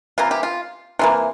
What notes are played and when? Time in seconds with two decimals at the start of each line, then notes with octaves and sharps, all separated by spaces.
0.18 C3 E3 A#3 F4
0.31 G4
0.43 F4
0.99 C3 E3 A#3 F4